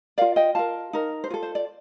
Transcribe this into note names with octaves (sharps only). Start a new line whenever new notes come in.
F4 A#4 D5 F5
D#5 G5
F4 A#4 F5 A5
D#4 A#4
C5
F4 A4 D5
C5
D5